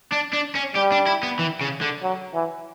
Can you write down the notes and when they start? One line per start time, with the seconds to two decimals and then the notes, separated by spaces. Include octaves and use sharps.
0.12 D4
0.33 D4
0.55 C#4
0.75 G3 G4
0.92 D4
1.07 E4
1.23 B3
1.39 E3
1.61 C#3
1.81 D3
2.03 F#3
2.34 E3